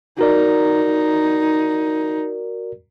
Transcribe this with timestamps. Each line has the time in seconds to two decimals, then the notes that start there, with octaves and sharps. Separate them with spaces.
0.19 D#4 F#4 A#4 D5